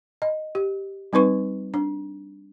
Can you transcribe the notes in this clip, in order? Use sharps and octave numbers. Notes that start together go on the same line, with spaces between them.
D#5
G4
G3 C4 D#4 B4 C#6
D4